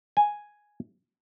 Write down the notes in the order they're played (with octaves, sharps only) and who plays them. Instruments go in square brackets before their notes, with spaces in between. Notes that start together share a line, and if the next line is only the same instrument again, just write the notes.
[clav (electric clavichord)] G#5